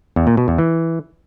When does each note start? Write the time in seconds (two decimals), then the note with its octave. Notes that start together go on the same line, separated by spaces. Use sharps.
0.16 E2
0.27 A#2
0.37 B2
0.48 E2
0.58 E3